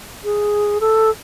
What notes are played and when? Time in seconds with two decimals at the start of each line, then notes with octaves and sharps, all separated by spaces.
0.24 G#4
0.81 A4